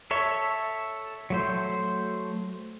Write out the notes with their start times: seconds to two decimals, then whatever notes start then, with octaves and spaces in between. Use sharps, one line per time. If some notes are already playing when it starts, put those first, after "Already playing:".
0.11 A4 C#5 E5
1.30 F#3 A3 C5